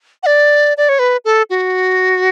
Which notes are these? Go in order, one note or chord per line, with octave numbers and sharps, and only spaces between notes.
F#5
D5
D5
C#5
B4
A4
F#4